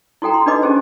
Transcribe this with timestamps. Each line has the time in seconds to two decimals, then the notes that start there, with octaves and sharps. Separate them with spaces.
0.22 E4 F#4 A4 G5 A#5
0.34 C6
0.46 D4 D#4 F#4 B4 D#5 D6
0.62 C#4 G4 G#4 C5